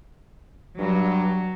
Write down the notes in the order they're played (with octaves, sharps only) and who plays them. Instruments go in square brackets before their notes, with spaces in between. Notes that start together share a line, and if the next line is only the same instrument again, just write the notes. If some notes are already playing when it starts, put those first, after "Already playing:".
[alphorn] G2 [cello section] F#3